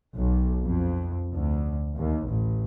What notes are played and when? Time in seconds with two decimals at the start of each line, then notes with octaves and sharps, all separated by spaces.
0.13 B1
0.64 F2
1.33 D2
1.95 D#2
2.27 A1